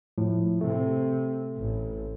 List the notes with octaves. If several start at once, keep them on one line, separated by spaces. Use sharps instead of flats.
A2 F3
C3 A3
A1